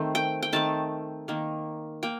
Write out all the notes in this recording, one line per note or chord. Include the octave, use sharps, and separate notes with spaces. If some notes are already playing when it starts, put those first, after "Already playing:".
Already playing: D#3 A3 C4 C5
G5
G5
D#3 A3 C4 A5
D#3 A#3
A#3 G5